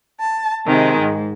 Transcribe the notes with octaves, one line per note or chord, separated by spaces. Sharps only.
A5
C3 D#3 G#3
G#2